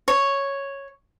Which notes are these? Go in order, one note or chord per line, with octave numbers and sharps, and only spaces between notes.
C#5